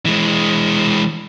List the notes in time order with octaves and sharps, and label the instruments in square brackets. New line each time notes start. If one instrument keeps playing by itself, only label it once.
[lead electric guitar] E3 G#3